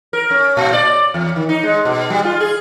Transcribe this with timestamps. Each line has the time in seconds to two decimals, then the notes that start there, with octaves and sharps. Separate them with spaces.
0.13 A#4
0.31 C#4
0.57 A#2
0.73 D5
1.14 E2
1.36 D#3
1.49 D#4
1.63 G#3
1.85 B2
2.10 G3
2.24 F4
2.40 G#4